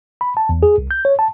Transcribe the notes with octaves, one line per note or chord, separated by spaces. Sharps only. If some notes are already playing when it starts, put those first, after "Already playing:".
B5
A5
E2
G#4
C2
G6
C#5
A5